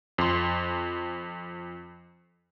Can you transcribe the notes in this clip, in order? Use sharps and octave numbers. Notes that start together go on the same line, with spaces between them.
F2 C6